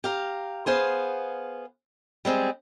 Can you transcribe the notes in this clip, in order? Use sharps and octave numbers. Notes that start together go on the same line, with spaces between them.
G4 F5 A#5
B3 G#4 C5 F5
G3 G#3 C4 G#4